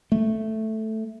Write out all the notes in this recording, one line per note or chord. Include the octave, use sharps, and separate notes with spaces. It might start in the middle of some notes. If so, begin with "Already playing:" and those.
A3